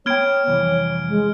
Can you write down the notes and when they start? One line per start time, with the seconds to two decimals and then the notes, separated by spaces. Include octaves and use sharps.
0.06 B3 C#5 G5 F6 G#6 D7
0.47 C2 F2 E3
1.08 G#3